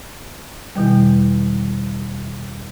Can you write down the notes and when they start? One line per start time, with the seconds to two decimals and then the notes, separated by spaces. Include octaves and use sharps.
0.76 E2 B2 D#3 G3